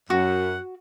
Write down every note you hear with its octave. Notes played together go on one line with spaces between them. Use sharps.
F#2 F#4 F#5